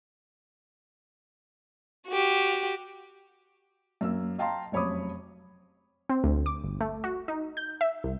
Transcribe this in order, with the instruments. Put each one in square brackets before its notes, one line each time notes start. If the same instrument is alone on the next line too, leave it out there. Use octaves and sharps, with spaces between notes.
[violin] F#4 G4
[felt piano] F#2 A#3 E6
D#5 F5 G5 A5 A#5 C6
F1 F#2 C#5 B5 D6 D#6
[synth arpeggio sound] C4
D2
D6
G1
A3
F#4
D#4
G6
E5
C2